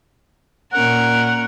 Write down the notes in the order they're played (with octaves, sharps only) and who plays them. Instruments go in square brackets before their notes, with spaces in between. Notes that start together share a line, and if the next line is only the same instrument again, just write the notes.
[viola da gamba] A#2 C#4 A#4 [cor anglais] F#5